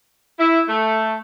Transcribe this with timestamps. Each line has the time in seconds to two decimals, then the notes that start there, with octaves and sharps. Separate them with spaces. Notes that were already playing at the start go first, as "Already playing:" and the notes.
0.39 E4
0.68 A3